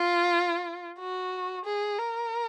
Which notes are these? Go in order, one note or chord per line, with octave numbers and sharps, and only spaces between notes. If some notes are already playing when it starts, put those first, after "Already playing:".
Already playing: F4
F#4
G#4
A#4